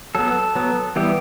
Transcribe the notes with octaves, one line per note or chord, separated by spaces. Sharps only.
F#3 B3 A4
F#3 B3
E3 G3 B3 G4